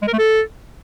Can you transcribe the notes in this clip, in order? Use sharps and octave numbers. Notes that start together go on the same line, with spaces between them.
G#3
A#4
A3
A4